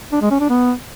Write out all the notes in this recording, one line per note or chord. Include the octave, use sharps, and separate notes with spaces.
D4
G#3
C#4
D4
B3